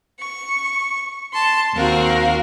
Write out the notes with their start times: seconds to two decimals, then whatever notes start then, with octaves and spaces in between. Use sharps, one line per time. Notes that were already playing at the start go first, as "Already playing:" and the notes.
0.20 C#6
1.33 A5 C6
1.75 D#2 C4 F#4 A#4 F5